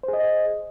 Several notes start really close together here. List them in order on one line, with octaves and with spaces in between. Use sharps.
C5 G#4 D#5